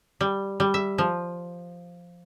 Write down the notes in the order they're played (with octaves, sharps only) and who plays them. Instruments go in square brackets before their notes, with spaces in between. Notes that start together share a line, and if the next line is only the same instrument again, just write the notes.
[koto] G3
G3
E5
F3